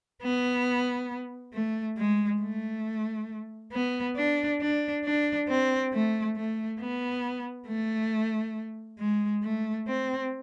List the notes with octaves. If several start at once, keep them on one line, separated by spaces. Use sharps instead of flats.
B3
A3
G#3
A3
B3
D4
D4
D4
C4
A3
A3
B3
A3
G#3
A3
C4